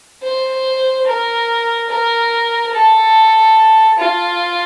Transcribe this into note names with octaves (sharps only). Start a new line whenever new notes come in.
C5
A#4
A#4
A4
F4